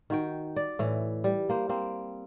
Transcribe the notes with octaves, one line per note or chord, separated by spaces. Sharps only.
D#3 F#4 G5
D5
A2 E3
G3
A#3 C5
A#3 C4